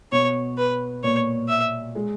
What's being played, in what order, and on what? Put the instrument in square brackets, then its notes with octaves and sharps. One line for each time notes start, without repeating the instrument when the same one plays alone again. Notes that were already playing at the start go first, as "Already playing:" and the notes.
[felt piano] B2 B3 [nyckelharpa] C#5
[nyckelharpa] B4
[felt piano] A#2 A#3 [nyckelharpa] C#5
[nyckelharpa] E5
[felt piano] G#3